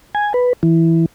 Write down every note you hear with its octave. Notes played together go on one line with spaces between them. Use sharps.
G#5
B4
E3